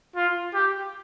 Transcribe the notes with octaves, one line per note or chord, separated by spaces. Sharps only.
F4
G4